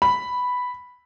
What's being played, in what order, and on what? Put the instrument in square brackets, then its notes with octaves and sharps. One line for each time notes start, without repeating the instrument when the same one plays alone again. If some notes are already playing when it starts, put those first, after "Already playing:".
[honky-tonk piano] B5